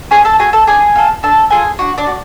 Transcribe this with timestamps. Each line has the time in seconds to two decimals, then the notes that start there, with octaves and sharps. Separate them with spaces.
0.11 C#4 G#4 G#5
0.25 A4 A5
0.39 F#4 G#4 A4 G#5
0.53 A4 A5
0.67 D4 G#4 G#5
0.96 F4 A4
1.23 D4 A4 A5
1.51 F4 G#4 A4 G#5
1.79 D4 F#4 F#5
1.98 D4 D5
2.07 F#4